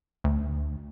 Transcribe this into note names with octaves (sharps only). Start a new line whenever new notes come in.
D2